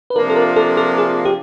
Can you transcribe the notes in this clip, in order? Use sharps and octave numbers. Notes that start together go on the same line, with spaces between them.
B4
C3 F3 A#3 D4 F4 A#4
A4
A#4
A4
A4
G#4
G4